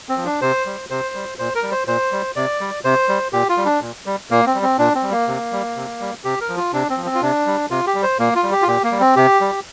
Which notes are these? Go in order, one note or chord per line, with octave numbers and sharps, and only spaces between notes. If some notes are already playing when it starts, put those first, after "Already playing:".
C4
F3
D4
C3 C5
G3
C3 C5
G3
A#2 C5
A#4
G3
C5
A#2 C5
G3
C3 D5
G3
C3 C5
G3
A#2 G4
F4
G3
D4
A#2
G3
A#2 A#3
C4
G3
C4
A#2 D4
C4
G3
A#3
C3
G3
C3
G3
C3 G4
A#4
F3
F4
C3 D4
C4
F3
C4
F4
C3 D4
G3
C3 F4
G4
G3
C5
A#2 A#3
F4
G3
G4
F4
A#2 G4
A#3
G3
C4
C3 G4
G3